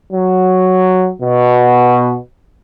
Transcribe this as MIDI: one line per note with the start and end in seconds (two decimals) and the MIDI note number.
0.12 1.09 54
1.22 2.15 47